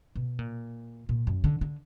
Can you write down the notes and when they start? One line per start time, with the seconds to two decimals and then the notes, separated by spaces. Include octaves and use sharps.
0.16 B2
0.39 A#2
1.09 A#2
1.27 F#2
1.44 D3
1.61 D3